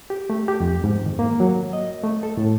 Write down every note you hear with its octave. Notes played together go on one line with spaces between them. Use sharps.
G4
A3
G4
F2
G#2
D#3
A#3
F#3
D#5
A3
A4
A2